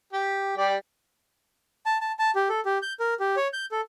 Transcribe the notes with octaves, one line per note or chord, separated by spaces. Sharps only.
G4
G3 G4 D5
A5
A5
A5
G4
A4
G4
G6
A#4
G4
C#5
G6
A4